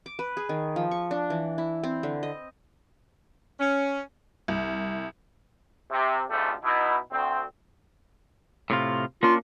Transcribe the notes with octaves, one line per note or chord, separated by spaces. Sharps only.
D6
B4
G#4
D#3
F3
C#6
D4
E3
E4
C4
D3
D#5
C#4
C2
C3
G#1 D2 G#2 F3 G3 A3
B2 D#4 E4
D2 C4
A2 C3 F4
A#3 C#4 D4 F4